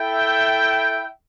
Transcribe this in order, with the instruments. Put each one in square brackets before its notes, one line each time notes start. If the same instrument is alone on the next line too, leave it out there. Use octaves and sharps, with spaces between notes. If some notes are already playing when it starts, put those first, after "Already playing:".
Already playing: [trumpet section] E4 A4 E5 G5